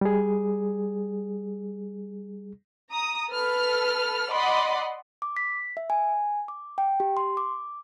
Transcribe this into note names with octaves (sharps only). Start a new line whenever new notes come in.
G3 G#4
A#5 D#6
A4 B4 F6
D5 D#5 F#5 B5 C6
D6
B6
E5
G#5
D6
G5
G4
C6
D6